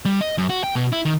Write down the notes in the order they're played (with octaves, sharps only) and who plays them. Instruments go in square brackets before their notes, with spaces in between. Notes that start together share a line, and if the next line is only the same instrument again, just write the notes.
[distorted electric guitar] G3
D#5
F#2
F#4
G5
B2
E4
D#3